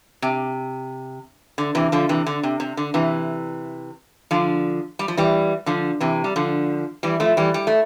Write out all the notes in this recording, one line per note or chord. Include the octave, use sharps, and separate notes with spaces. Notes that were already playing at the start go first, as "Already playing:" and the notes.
C3
D3
C3 E3
D3 F3
C3 E3
D3
C3
C3
D3
C3 E3
D3 F3
G3
F3
E3 G3
D3 F3
C3 E3
G3
D3 F3
E3 G3
F3 A3
E3 G3
G3
A3